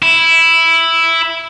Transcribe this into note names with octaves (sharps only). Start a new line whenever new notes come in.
E4